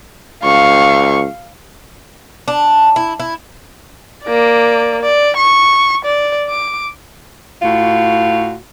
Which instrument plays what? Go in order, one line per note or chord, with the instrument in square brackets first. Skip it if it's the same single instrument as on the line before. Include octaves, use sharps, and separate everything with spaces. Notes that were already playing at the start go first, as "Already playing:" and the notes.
[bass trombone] C#2 [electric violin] F5 [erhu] C#6
[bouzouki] D4
E4
E4
[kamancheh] A#3 D5
D5
C#6
D5
D6
[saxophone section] A2 F4 F#4